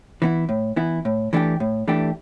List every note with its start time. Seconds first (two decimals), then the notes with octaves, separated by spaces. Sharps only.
0.22 E3 B3 E4
0.49 A2
0.76 E3 B3 E4
1.05 A2
1.33 E3 A3 D4 G4
1.60 A2
1.88 E3 A3 D4 G4